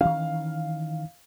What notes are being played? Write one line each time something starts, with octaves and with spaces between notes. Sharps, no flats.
D#3 E3 C#4 F5